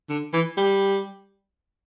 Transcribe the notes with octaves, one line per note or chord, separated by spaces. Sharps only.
D3
E3
G3